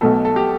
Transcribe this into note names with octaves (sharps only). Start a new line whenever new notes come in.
B1 B2 A3 A4
A4
G4